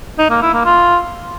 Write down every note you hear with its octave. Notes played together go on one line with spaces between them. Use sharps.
D#4
A#3
E4
A#3
F4